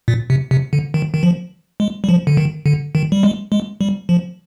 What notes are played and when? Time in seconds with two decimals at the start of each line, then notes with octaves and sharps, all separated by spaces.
0.08 A#2
0.30 C3
0.51 C3
0.73 D3
0.94 D#3
1.14 D#3
1.23 F3
1.80 G#3
2.04 G3
2.09 F3
2.27 D3
2.37 D#3
2.66 D3
2.95 D#3
3.12 G3
3.23 G#3
3.52 G#3
3.81 G3
4.09 F3